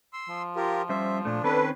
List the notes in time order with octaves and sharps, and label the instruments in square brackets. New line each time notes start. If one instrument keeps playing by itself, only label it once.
[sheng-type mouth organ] C6 E6
[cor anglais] F3
[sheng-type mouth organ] F4 G4 A#4
[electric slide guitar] G3 C#4 C5 [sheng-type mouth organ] E5
[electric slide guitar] A#2 A3 [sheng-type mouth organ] D4
[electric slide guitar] D#3 C4 C#4 [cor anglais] A4 [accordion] B4